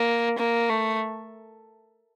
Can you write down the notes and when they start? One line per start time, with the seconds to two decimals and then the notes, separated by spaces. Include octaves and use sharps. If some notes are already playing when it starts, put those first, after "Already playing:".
Already playing: A#3
0.38 A#3
0.69 A3